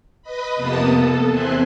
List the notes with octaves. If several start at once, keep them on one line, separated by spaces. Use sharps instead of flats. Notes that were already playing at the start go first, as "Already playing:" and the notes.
B4 D#5 B5
F2 C3 A#3 B3 A5 D#6
A4
E2 C4 E5 G#5 C6 F#6